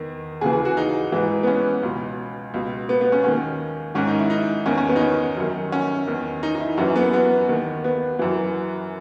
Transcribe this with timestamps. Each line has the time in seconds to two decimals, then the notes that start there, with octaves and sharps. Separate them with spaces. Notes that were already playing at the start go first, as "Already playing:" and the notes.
Already playing: E2 D#3
0.41 D#2 C#3 E3 G#4
0.53 G#4
0.65 F#4
0.77 D#4
1.12 G#2 E3
1.43 B3
1.47 C#4
1.83 C#2 B2
2.54 C#2 B2
2.89 B3
3.01 B3
3.12 C#4
3.24 D#2 D#3 C#4
3.95 G#2 D#3 C#4
4.07 D#4
4.19 E4
4.30 D#4
4.66 E2 D#3 C#4
4.78 C#4
4.89 B3
4.96 D#4
5.01 C#4
5.37 F#2 D#3
5.72 C#4
6.07 E2 D#3
6.43 D#4
6.55 D#4
6.60 E4
6.77 F#2 E3 C#4
6.96 B3
7.13 B3
7.49 D#2 D#3
7.84 B3
8.19 F#2 E3